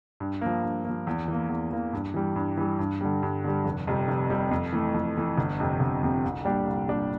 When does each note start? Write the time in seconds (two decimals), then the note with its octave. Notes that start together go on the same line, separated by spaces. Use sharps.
0.20 G2
0.41 F3 A#3
0.64 G2
0.85 F3 A#3
1.07 E2
1.28 E3 A#3
1.49 E2
1.71 E3 A#3
1.93 G2
2.14 E3 G3
2.36 G2
2.57 E3 G3
2.79 G2
3.01 D3 G3
3.23 G2
3.44 D3 G3
3.65 F1
3.87 F2 C3 G3
4.08 F1
4.30 F2 C3 G3
4.51 F2
4.73 E3 A3
4.94 F2
5.17 E3 A3
5.38 G1
5.60 F2 C3
5.80 G1
6.03 F2 C3
6.24 C2
6.45 A#2 G3 D4 G4
6.66 C2
6.88 A#2 G3 D4 G4